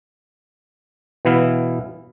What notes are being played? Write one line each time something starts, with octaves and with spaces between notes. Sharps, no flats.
B2 E3 B3 E4 F5